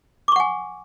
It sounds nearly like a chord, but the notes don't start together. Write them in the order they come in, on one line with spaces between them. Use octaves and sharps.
D6 C#6 F#5 G#5